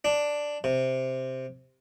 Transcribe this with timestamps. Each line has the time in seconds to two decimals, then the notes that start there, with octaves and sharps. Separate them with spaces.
0.05 D4
0.64 C3